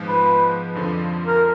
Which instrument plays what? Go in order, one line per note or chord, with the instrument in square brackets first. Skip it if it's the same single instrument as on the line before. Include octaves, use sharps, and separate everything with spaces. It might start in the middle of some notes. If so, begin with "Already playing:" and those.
Already playing: [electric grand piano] G#2 F3 G#3 B3
[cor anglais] B4
[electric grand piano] F2 D3 F3
[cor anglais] A#4